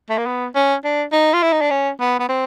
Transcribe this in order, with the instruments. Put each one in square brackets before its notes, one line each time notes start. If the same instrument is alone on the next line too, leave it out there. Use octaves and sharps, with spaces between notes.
[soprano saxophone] A3
A#3
B3
C#4
D4
D#4
F4
E4
D#4
D4
C#4
B3
B3
C4